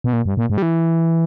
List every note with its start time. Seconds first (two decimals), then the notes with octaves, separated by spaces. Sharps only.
0.04 B2
0.13 A#2
0.26 G2
0.37 A#2
0.50 G#2
0.58 G3
0.62 E3